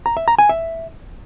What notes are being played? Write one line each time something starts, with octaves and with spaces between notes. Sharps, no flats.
A#5
E5
A#5
G#5
E5